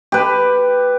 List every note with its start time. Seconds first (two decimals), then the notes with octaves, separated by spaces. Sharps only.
0.12 G4 B4